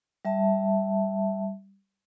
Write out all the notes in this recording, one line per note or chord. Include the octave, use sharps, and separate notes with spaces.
G3 E5 A5